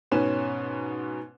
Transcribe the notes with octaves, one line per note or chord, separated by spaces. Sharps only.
G#2 B2 C#4 B4 G#5 E7